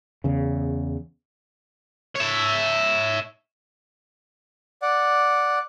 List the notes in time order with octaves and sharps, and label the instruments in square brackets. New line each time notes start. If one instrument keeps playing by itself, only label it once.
[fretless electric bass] E2 C#3
[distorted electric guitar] C#5 E5
[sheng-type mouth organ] D5 F#5